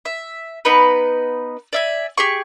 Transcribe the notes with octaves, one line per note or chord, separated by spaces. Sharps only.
E5
B3 D#4 B4
D5 E5 G#5
G4 G#4 C#6